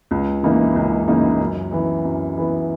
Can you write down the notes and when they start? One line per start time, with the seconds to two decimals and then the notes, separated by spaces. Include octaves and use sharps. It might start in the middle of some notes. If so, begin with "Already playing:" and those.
0.11 C#2
0.43 C#3 E3 A#3 D#4
0.76 C#2
1.08 C#3 E3 A#3 D#4
1.41 F#2
1.72 E3 B3
2.05 F#2
2.37 E3 B3